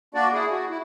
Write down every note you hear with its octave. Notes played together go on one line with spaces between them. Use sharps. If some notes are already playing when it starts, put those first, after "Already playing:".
A#3 D4 F#4 D5
E4 G#4
F#4
E4